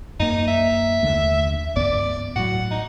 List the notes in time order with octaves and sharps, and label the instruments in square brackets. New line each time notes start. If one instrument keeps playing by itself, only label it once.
[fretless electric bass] F#2 A#3 [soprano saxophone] D#4
[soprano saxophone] E5
[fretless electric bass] D#2 D3 A3
[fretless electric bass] C#2 G2 B3 [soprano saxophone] D5
[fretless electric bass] A2 F#3 [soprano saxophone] F#5
[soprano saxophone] D#4